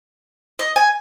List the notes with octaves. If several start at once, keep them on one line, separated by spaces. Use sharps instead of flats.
D#5
G#5